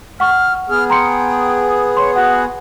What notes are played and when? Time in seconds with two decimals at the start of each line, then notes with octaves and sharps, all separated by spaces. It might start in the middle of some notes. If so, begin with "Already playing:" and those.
0.20 F#5 C#6 F6
0.70 B3 G#4 F6
0.90 G5 A#5 C6 C#7
1.97 C#5 C6
2.16 F#4 F#5